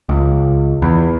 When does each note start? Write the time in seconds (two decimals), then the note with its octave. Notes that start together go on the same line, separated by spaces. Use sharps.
0.09 C#2
0.82 E2